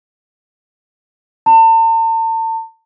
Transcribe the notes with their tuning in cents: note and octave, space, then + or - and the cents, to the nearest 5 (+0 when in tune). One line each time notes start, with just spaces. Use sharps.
A5 +40